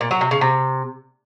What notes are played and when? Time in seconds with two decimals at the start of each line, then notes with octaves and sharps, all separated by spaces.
0.01 A#2
0.11 F#3
0.21 C3
0.31 C#3
0.41 C3